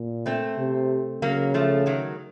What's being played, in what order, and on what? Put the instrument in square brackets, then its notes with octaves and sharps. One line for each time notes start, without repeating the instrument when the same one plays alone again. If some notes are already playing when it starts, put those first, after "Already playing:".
Already playing: [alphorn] A#2
[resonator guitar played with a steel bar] A3 C4
[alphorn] C3
[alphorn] C#3 [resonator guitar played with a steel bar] F#3 A#3
[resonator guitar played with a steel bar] F3 A3
D#3 F#3